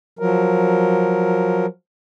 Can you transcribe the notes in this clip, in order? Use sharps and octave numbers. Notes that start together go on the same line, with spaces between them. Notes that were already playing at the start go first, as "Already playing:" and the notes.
F3 F#3 A#4